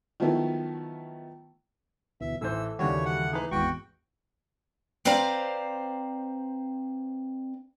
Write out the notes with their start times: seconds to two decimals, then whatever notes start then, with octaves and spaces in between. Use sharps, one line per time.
0.20 D#3 F3 F#3 A3 B3 E4
2.21 D2 B2 E3 E5
2.41 A1 E3 A3 C5 E6
2.79 D#2 C#3 E3 G3 F#4 C#5
3.05 F#5
3.32 E3 D#4 G#4 B4
3.51 G#1 E2 F#4 G5 C#6
5.05 C4 B4 C5 D5 F5 A#5